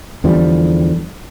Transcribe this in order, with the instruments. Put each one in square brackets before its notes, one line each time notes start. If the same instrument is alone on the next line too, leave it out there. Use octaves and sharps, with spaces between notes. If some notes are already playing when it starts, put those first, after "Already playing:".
[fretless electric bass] E2 D3 F3 G3